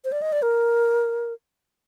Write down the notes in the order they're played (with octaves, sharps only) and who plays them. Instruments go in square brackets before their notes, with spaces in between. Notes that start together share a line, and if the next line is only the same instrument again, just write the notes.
[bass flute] C5
D5
D#5
D5
A#4